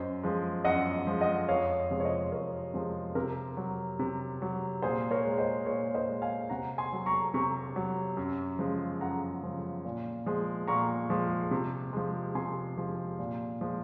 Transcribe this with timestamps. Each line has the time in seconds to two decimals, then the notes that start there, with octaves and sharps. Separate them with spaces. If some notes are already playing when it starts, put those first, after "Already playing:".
Already playing: F#2 C5 D#5
0.24 F3 G#3
0.65 F#2 D#5 F#5
1.07 F3 G#3
1.21 D#5 F#5
1.49 F2 C#5 F5
1.91 C3 F3 G#3
2.00 C#5
2.04 C5 D#5
2.32 F2 A#4 C#5
2.74 C3 F3 G#3
3.15 C3 A#4
3.57 F#3
3.99 C3
4.42 F#3
4.82 A#2 G#4 C5
5.11 A#4 C#5
5.25 G#3
5.38 C5 D#5
5.66 A#2 A#4 C#5
5.94 C5 D#5
6.08 G#3
6.22 F5 G#5
6.50 C3 F#5 A#5
6.78 G#5 C6
6.92 F#3
7.06 A#5 C#6
7.34 C3 A#5 C#6
7.76 F#3
8.17 F#2
8.59 C#3 F3 G#3
9.01 F#2 F#5 A#5
9.43 C#3 F3 G#3
9.85 A#2
10.26 F3 G#3
10.68 A#2 A#5 C#6
11.10 F3 G#3
11.51 C3
11.93 F3 G#3
12.35 C3 G#5 C6
12.78 F3 G#3
13.19 A#2
13.61 F3 G#3